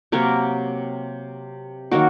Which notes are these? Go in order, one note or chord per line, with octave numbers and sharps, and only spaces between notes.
C3 F#3 A#3 A#4 C#5
D#3 F#3 A#3 F#4 A#4